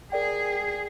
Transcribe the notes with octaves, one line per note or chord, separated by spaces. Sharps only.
G#4 A#4 D5 G5